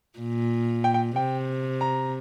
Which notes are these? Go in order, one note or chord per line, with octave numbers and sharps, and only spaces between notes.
A#2
G5
G5
C3 G5
A#5